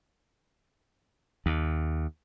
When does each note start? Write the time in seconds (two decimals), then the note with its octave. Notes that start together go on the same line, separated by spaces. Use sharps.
1.46 D#2